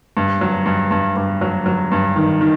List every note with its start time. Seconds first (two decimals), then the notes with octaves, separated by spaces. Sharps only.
0.17 G2
0.41 F#3
0.66 G2
0.91 G2
1.16 G2
1.41 F#3
1.66 F#3
1.92 G2
2.16 D#3
2.41 D#3